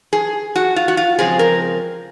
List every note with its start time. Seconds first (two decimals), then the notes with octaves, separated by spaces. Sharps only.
0.13 G#4
0.56 F#4
0.76 F4
0.88 F#4
0.97 F4
1.19 C#3 F3 G#3 C4 G#4
1.39 A#4